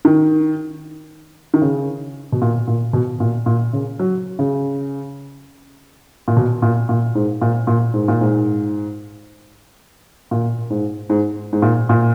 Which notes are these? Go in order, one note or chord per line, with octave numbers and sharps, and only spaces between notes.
D#3
D#3
C#3
B2
A#2
A#2
B2
A#2
A#2
C#3
F#3
C#3
A#2
B2
A#2
A#2
G#2
A#2
A#2
G#2
A#2
G#2
A#2
G#2
G#2
G#2
A#2
A#2